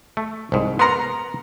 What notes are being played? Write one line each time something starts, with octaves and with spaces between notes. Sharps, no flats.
A3
C2 G#2
B3 A#4 F#5 A#5 C6